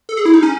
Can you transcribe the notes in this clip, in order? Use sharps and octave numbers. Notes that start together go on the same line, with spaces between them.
A4
G#4
E4
D#4
C#4